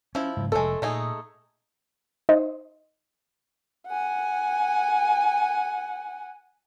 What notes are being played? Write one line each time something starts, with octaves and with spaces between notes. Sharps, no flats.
F3 C#4 E4
G#2 C#3 F#3
F1 G#3 A3 A4
A#2 A3 D#4 G#4
D#4 C5 D#5
F#5 G#5